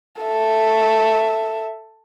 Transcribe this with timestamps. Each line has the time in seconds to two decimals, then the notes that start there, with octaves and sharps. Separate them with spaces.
0.22 A4 E5